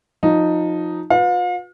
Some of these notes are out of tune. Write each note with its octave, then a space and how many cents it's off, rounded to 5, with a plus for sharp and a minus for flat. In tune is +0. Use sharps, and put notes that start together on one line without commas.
F3 +25 D#4 +0
F4 +40 B4 +0 F5 +40